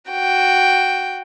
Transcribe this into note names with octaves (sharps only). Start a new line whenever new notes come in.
F#4 G5